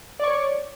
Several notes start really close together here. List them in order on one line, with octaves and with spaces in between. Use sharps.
D5 C#6 C#5